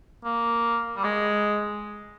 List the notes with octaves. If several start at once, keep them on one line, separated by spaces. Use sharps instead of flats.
A#3
G3
G#3